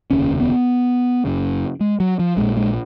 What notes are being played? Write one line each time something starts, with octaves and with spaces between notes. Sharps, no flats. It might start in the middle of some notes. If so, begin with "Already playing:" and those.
F1 D#2 C#3 C#4
B3
F#1 F#2 C#3
G#3
F#3
F3
A#1 A#2 G#3
G#3